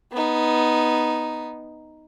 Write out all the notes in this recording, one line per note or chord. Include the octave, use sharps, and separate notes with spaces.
B3 D#4